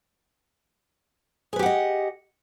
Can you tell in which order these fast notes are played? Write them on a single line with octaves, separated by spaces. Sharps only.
G#4 B4 G4 F#5 D#5